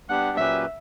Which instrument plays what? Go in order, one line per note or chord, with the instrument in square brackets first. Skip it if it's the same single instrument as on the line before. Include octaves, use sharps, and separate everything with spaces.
[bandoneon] G3 B3 D4 G4 [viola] F#5
[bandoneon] A#2 F#3 C#4 G4 B4 [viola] E5